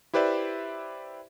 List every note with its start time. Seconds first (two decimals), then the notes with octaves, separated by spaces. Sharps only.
0.14 E4 G4 B4 C5 D5 E5